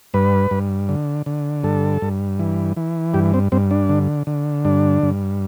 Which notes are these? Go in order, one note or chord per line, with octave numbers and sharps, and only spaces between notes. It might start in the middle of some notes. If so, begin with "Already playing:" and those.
G2 B4
G2
D3
D3
G2 A4
G2
E3
E3
G2 G4
C4
G2 C4
D4
D3
D3
G2 D4
G2